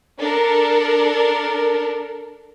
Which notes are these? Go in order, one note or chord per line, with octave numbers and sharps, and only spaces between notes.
D4 A4 A#4